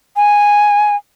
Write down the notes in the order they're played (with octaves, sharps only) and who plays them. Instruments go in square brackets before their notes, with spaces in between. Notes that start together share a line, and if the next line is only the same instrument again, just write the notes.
[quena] G#5